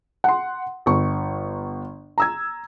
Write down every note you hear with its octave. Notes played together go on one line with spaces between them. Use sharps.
F#5 C6
G1 C#6
A#5 E6 G#6